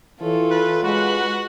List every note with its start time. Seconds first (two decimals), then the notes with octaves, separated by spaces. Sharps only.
0.21 E3 F4 A4 C#5
0.51 B4
0.84 G#3 F#4 B4 F#5